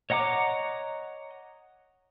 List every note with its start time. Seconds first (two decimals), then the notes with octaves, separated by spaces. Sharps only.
0.10 C#5 D#5 F#5 A#5 D6